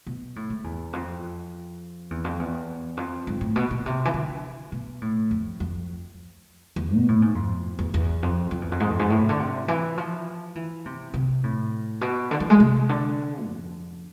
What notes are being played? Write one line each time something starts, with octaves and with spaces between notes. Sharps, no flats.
B2
A2
G#2
E2
F2
E2
F2
E2
F2
G#2
A2
B2
B2
C3
E3
D3
B2
A2
F2
F2
E2
B2
A2
G#2
F2
E2
E2
F2
F2
E2
F2
G#2
F2
G#2
A2
C3
D3
C3
E3
F3
E3
C3
C3
A2
B2
D3
E3
G#3
C3
D3
F2